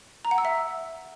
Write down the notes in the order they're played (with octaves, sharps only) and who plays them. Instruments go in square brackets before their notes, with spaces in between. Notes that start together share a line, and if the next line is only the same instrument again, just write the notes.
[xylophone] A#5
F#5
E6
E5